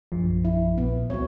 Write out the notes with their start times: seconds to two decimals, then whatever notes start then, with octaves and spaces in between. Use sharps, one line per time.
0.12 A#1 F#2 F3
0.45 E4
0.78 A#2 B3
1.10 C#2 F#3 C4 C#5